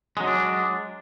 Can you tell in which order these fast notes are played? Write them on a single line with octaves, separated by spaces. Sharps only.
G#3 F#3 D#4 D4